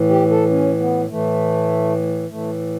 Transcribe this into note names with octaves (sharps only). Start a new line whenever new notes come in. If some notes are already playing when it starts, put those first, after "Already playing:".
Already playing: A2 E3
G4
A4
C#4
B3
A2 E3 A3
A2 E3 A3